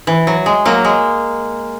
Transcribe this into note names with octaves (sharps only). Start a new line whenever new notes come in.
E3
F#3
G#3
F#3 A#3
G#3